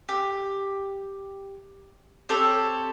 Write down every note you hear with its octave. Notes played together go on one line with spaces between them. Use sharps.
G4
C4 G4 A4 C#5